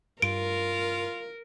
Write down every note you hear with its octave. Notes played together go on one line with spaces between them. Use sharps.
G2 F4 A#4 D7